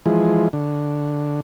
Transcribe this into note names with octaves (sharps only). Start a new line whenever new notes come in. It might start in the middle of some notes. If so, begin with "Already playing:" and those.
E3 F3 G#3
D3